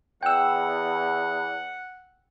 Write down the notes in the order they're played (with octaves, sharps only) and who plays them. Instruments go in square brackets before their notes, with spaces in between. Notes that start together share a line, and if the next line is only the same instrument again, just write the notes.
[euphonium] E2 [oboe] F#5 [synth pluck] G5 E6